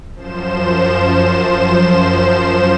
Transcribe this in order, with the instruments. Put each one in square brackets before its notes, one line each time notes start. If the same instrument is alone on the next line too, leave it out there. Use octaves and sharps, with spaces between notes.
[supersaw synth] F#2 F3 C5 E7